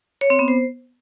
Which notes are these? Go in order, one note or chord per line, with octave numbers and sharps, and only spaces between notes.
C#5
C4
B3
C5